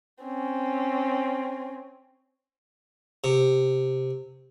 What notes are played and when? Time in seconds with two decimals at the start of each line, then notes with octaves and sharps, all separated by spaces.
0.24 C4 C#4
3.24 C3